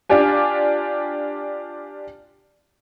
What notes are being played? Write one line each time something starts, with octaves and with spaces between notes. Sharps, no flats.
D4 F4 G4 G#5